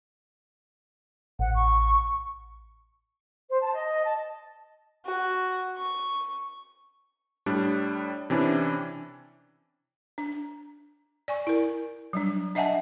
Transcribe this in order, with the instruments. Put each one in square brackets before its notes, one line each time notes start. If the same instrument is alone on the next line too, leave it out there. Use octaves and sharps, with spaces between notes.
[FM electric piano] A1 [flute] F#5
[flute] C#6
[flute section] C5
A5
D#5
A5
[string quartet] F#4
C#6
[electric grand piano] A2 G3 D4
C3 E3 C#4 D4 E4
[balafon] D4
D5 G#5 C#6
E4 A#4
F#3 G3 D4
D4 D#5 E5 F#5 G#5 A5